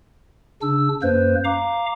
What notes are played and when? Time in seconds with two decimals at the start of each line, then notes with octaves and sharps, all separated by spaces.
0.62 C#3 D4 E6
1.02 F#2 A#3 B4 C5
1.44 F5 A#5 D6